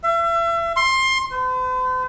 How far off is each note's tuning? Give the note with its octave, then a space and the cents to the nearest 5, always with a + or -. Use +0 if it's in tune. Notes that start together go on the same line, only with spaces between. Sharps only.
E5 +35
C6 +20
C5 -45